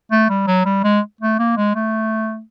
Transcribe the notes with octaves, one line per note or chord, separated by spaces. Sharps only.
A3
G3
F#3
G3
G#3
A3
A#3
G#3
A3